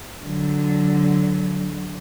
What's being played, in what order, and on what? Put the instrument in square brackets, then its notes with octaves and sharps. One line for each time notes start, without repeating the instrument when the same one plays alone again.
[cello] D3 F#3